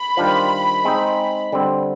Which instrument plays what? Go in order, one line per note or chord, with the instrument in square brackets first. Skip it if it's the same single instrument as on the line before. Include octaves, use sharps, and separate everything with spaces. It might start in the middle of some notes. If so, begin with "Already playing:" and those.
Already playing: [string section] B5
[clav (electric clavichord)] D#3 G3 D4 F4 C5
G#3 C4 D#4
D3 G3 C4